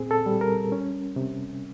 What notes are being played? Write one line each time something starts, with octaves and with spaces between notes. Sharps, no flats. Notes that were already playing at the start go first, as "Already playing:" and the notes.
Already playing: A#2 C4 G#4
A4
G3
A#4
C#4
C3